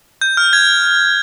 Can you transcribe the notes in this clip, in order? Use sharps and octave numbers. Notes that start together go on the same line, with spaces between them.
G6
F6
G#6